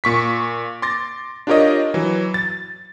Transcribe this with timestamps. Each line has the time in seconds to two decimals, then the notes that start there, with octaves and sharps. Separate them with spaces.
0.04 A#2 C#6 B6
0.82 C6 D6 A6 A#6
1.47 D4 F4 G4 A#4 C#5 D#5
1.94 E3 F#3
2.34 A6